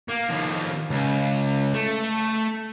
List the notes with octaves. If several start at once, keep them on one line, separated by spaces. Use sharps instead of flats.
A#3
D#2 F3
C#2
A3